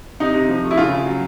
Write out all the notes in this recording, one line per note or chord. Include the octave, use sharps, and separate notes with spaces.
C3 D#4
C3
F3
A3
E4
C#3 F4
C#3
F#3